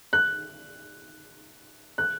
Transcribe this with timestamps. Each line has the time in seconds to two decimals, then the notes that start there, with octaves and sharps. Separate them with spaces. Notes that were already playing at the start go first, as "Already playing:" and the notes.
0.13 F#6
1.98 F#6